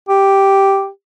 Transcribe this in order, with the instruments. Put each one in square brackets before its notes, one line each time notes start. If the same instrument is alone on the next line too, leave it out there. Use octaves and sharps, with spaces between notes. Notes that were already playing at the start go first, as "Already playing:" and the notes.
[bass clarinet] G4